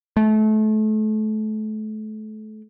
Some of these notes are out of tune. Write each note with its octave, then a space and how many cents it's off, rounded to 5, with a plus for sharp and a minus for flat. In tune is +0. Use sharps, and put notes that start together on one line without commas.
A3 -30